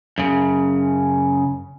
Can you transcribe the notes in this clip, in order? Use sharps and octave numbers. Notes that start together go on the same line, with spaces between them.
F#2 C#3